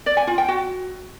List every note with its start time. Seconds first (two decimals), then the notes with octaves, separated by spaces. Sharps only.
0.06 D5
0.17 G#5
0.27 F4
0.38 G5
0.48 F#4